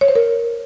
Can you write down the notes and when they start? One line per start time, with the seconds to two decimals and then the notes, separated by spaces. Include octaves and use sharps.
0.01 C#5
0.08 C5
0.15 A#4